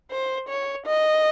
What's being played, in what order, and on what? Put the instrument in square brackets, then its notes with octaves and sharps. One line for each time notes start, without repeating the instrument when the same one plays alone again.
[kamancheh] C5
C#5
D#5